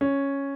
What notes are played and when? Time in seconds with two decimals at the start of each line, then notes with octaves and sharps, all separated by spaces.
0.01 C#4